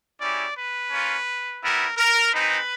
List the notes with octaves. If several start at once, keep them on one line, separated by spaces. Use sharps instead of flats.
G#3 C#4 E4 G4 D5
B4
A#3 C#4 F4
G3 B3 E4 A#4
A#4
G#3 C4 D#4 B4